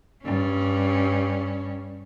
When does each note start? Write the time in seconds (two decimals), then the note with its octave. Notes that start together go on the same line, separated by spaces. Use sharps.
0.24 G2 C#4